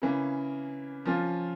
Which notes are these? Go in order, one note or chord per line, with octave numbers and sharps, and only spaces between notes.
C#3 E3 A#3 C#4
F3 A#3 C#4 F4